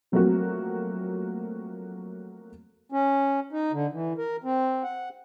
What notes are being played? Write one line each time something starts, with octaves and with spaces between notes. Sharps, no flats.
F3 F#3 A3 A#3 C4 F#4
C#4
D#4
D3
E3
A#4
C4
F#5